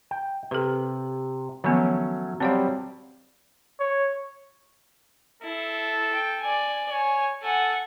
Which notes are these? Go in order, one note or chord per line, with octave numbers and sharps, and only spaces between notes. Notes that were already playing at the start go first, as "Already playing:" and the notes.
G5
C3 A4 B4
D#3 F3 F#3 A3 B3 C#4
F#3 G3 C4 C5 C#5 F5
C#5
E4 A4
G5
D5 G#5
C#5 G#5
A4 F#5 G#5